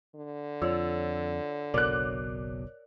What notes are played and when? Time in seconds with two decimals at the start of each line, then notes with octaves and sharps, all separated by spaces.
0.15 D3
0.62 F2 F4 C#5 D5 E6
1.74 F#1 B1 B2 A#4 C#5 D5 D6 F#6